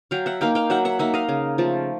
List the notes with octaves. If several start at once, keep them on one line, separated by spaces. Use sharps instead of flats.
F#3 F5 G5
E5 F#5
A#3 D#4 F5 G5
F5 G5
F#3 E5 F#5
E5 F#5
A#3 D#4 E5 F#5
D#5 F5
C#3
F3 A3